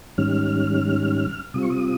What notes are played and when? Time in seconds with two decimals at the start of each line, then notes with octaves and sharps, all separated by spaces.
0.18 G#2 D#3 G3 C#4 F6
1.54 C3 G3 C4 F4 D#6
1.62 C#6
1.70 D#6